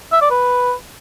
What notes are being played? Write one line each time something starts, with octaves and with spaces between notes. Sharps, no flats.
E5
D5
B4